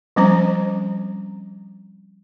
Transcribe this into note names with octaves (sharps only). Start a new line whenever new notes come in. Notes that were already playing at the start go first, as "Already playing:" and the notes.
F3 G3 C4 C#4 C5 A#5